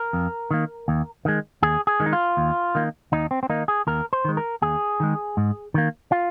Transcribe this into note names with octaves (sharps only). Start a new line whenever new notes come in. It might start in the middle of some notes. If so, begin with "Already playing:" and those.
Already playing: A#4
F2
D#3 A#3
D#2
D#3 G#3
D#2 G#4
G#4
D#3 G#3
D#4
F4
D#2
D#3 A#3
D#2 D#4
C4
C4
D#3 A#3 D#4
G#4
D#2 A#4
C5
D#3 G#3
A#4
D#2 G#4
D#3 G#3
G#2
D#3 A#3
F4